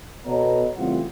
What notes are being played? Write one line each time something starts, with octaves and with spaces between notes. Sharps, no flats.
B2 B3 A4 C#5 D#5 A#5
A1 C#3 G3 C4 F4 F#5